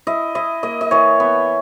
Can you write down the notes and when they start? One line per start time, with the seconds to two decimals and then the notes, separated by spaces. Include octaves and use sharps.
0.07 E4 D#5
0.35 E4 D#5
0.63 A#3 D#5
0.81 D#5
0.91 E3 C#5
1.20 B3